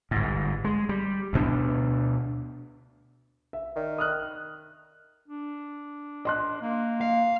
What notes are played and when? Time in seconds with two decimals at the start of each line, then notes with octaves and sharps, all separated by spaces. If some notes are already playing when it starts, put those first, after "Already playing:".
0.11 G1 G#2
0.65 G#3
0.89 G3
1.33 D2 B2 D4
3.53 E5
3.76 D#3 D5
3.98 D#6 F6 F#6
5.28 D4
6.25 D#5 C6 F#6
6.61 A#3
7.01 F5